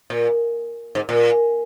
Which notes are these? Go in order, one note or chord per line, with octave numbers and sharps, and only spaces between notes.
A#2
G#2
A#2